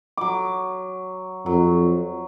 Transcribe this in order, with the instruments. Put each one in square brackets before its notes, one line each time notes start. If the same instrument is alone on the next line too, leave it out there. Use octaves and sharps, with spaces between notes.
[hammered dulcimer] F#3 D6
[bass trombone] F2 [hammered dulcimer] F#3